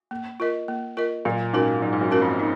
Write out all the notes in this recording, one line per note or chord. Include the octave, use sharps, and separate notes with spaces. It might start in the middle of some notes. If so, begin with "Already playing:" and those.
A#3
F4 A#4 D#5
A#3
F4 A#4 D#5
A#2 F#3
G#2 C#4 F#4 A#4
G#2 F#3
G#2
F#2
C#4 F#4 A#4
F2
D#4